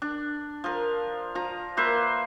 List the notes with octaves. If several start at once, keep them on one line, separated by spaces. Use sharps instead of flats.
D4
F3 A#4
F3 A#5
A#3 B4 C5 E5